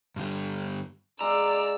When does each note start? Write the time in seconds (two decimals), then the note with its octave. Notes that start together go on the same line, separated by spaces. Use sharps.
0.16 G2 D3 G3
1.21 G#3 D5 F5 A#5 E6